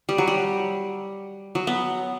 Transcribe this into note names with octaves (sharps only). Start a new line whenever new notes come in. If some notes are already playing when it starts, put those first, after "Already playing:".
G3
F#3
G3
F#3
B3